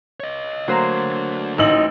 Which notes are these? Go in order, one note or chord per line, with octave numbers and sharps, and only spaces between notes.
C#5 D#5
D3 F#3 A3 A#3 C5
A1 D#4 E6 F#7